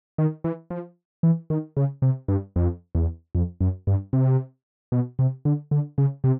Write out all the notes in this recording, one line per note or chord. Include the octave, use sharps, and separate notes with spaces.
D#3
E3
F3
E3
D#3
C#3
C3
G2
F2
E2
F2
F#2
G2
C3
B2
C3
D3
D3
C#3
C3